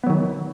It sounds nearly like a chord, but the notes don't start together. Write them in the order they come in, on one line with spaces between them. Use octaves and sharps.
B3 F#3 D#3